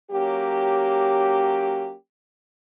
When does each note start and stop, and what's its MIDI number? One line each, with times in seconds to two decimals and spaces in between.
0.12 1.93 54
0.12 1.93 58
0.12 1.93 61
0.12 1.93 67